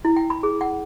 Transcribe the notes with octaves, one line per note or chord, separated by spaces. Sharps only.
E4
G5
B5
G#4
F#5